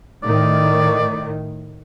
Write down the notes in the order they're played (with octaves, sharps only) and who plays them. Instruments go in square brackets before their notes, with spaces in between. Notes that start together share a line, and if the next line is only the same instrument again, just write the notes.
[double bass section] A2 D#3 [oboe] D5